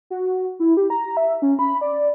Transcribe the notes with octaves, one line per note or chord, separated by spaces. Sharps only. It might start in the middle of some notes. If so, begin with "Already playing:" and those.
F#4
E4
G4
A#5
E5
C#4
B5
D5